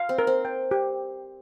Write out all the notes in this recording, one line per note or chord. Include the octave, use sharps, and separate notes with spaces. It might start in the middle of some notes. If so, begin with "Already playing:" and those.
Already playing: F5
C4
A#4
C4
G5
G4